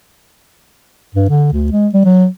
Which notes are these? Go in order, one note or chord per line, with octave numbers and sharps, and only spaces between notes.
G2
D3
D2
G#3
G3
F#3